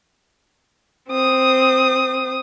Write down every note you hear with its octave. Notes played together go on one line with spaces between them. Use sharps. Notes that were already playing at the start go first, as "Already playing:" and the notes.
C4 D#6